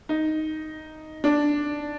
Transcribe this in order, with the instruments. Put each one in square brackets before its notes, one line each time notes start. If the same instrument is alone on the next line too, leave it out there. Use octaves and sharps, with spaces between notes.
[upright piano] D#4
D4